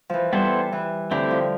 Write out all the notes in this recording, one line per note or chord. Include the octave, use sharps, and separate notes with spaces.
E3 F3
G3 B3 E4 A4 C5
E3
D3 A3 C4 E4 G4
F3